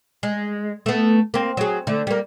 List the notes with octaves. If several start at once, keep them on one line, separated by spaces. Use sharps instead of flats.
G#3
A3 B3
A#3 C4
F#3 G#4
D3 A3
G3 A#3